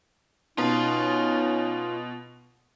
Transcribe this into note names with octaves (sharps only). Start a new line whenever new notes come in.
B2 C#4 D#4 F4